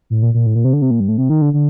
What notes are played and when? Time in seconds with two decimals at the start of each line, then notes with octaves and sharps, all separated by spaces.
0.10 A2
0.22 A#2
0.34 A#2
0.46 A2
0.55 A#2
0.64 C3
0.73 D3
0.82 C3
0.91 A#2
1.00 G2
1.08 A2
1.18 C3
1.29 D#3
1.41 D3
1.53 D3